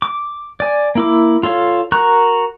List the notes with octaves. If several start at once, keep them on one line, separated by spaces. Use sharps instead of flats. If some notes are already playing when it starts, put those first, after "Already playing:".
D6
D5 G#5
A#3 E4 D6
F4 A4 C#5 F5
F#4 A#4 A#5 C#6 F#6